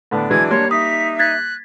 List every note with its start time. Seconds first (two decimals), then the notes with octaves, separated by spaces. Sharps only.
0.11 A2 D3 B3 D4
0.30 E3 F#3 G#3 G#6
0.50 G3 A#3 C#5 C6
0.71 D#4 E5 D#6 B6
1.19 F#6 G#6 A6 B6